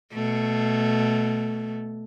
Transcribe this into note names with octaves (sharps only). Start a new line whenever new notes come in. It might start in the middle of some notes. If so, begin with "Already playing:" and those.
B2 A3